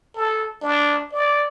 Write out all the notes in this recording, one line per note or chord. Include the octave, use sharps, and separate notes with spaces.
A4
D4
D5